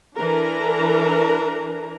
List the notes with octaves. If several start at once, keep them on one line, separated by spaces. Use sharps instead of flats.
E3 D4 A4 A#4 A#5